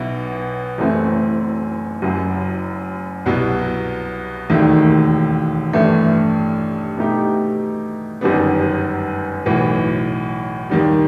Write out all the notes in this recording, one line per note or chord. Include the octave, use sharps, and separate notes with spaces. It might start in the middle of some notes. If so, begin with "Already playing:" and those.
Already playing: B1 B2 F#3 B3 E4
F#1 F#2 E3 A3 C4
F#1 F#2 F#3
C2 B2 F#3
E1 D#2 D#3 A3
A1 G2 E3 A3
B2 A3 D#4 G4
G1 F#2 D#3 G3 B3
B1 A2 E3
D#2 D#3 G3